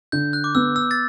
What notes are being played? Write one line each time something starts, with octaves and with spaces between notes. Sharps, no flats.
D3 G6
F#6
D6
B3 E6
E6
A6